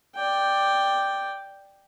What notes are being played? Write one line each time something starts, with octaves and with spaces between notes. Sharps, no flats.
D5 G5